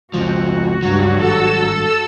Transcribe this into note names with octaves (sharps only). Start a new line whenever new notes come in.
C#2 F#2 F3 F#4
G2 F#3
G#1 G2 A4 E6